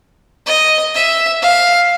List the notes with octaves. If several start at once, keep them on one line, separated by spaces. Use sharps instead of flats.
D#5
E5
F5